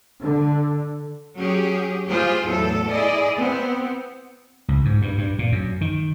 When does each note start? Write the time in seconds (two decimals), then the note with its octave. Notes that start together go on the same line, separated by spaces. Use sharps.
0.22 D3
1.37 F#3 C#4 G4 G#4
2.08 F4 G4 G#4 C5
2.45 E2 A2 F#3 A4
2.88 E4 G#4 D5 D#5
3.37 B3 C4
4.68 C#2
4.85 G#2
5.02 G2
5.18 G2
5.39 A#2
5.52 F#2
5.81 D#3